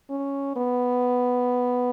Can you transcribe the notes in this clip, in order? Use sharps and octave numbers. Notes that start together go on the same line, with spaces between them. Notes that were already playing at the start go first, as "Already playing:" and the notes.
C#4
B3